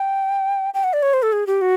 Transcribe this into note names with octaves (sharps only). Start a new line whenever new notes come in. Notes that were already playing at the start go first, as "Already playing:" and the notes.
Already playing: G5
G5
F#5
D5
C#5
C5
A4
G#4
G4
F#4